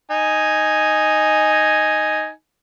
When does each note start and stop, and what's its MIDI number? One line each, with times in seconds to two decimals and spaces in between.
0.11 2.29 63
0.11 2.29 80